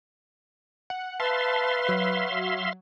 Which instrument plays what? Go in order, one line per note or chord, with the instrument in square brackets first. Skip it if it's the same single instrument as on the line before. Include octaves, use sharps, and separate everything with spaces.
[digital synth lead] F#5
[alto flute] B4 [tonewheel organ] E5 F5 C6 [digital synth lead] A5
[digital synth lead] F#3